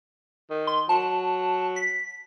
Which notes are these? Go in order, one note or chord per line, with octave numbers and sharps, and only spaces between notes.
D#3
C6
F#3 A5
B6